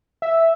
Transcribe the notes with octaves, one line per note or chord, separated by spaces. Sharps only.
E5